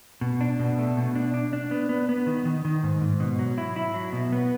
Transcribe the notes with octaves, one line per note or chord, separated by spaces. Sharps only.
B2
D4
B2
A3
B2
D4
D4
D4
B3
B3
B3
D#3
D#3
D#3
G#2
G#2
B2
F#3
E4
E4
F#3
B2
B3